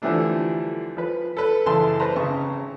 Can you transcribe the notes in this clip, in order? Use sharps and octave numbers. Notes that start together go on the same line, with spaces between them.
D3 E3 F3 G3 A3 D4
F3 B4
A4 B4
F#2 C#3 E3 A4 A5 C6
B4 C5 A5 A#5 C6
G#1 C#3 C#6